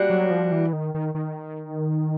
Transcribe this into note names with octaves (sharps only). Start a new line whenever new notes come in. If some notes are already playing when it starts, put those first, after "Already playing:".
Already playing: G3 A#3 D4 F#4
F#3
F3
E3
D#3
D#3
D#3